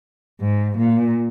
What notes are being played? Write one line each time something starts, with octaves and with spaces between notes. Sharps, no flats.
G#2
A#2